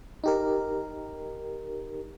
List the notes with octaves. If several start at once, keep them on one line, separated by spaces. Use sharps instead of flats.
D#4 G4 A#4